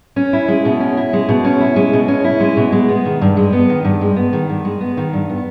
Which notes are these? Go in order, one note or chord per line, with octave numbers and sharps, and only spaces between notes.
C#4
E4
G#3
B2
C#4
E4
G#3
B2
C#4
E4
G#3
B2
C#4
E4
G#3
B2
G#3
B3
D#3
G2
G#3
B3
D#3
G2
G#3
B3
D#3
G2
G#3
B3
D#3
G2
B3